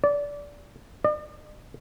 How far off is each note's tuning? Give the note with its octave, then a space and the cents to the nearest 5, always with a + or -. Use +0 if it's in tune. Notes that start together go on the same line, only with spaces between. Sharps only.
D5 -20
D5 +45